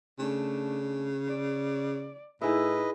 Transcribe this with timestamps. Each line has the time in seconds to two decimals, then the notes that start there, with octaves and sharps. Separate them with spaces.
0.19 C#3 A3 D4
1.28 D5
2.41 A2 D#4 E4 G#4 B4 D#5 E5